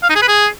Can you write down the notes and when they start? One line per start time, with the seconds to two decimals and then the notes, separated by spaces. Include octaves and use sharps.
0.03 F5
0.09 D#4
0.16 G#4
0.22 B4
0.28 G#4